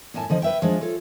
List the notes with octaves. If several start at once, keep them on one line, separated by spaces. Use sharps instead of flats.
F#2 A2 G#5 A5
D3 F3 D#5
B4 E5 G5
F3 G#3 D4
F4 A4 C#5